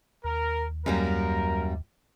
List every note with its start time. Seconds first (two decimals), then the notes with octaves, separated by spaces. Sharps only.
0.24 D#2 A#4
0.86 F#2 G3 A#3 A#4